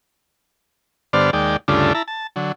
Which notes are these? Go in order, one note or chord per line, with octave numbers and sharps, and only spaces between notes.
G2 D3 B3 C5 D5 F6
D#2 G#3 D5 G5
D2 G2 C#3 A3 D4 F4
E4 A5 A#5
A5
D3 F#3